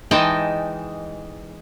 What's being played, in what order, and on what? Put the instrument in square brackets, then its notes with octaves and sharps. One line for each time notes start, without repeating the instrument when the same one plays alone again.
[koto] E3 G#3 D#4 D#5 G5 A5